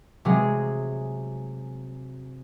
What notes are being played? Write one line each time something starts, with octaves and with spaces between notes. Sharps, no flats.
C3 F#3 G#3 G#4